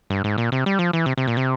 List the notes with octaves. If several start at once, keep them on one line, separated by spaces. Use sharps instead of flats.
G2
G#2
A#2
C3
G3
F3
E3
C3
C3
A#2
C3